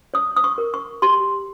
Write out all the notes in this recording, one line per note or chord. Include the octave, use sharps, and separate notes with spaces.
C#5 D#6
D#6
C#6
A#4
C#6
G4 C6